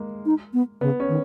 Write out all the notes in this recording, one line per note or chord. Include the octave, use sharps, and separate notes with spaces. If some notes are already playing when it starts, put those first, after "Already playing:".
Already playing: G#3 A#3
D#4
B3
C#3 B3
C#4
D#3